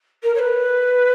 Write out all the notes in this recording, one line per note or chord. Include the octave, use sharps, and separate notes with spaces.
A#4
C#5
B4